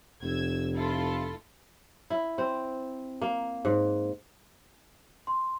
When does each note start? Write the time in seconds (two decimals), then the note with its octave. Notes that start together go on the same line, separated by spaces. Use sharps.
0.22 F1 E6 G#6
0.76 E4 F4 A4
2.10 E4
2.38 C4
3.22 A#3
3.65 G#2
5.27 C6